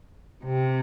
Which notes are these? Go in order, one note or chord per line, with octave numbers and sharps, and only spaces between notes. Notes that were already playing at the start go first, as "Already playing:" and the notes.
C3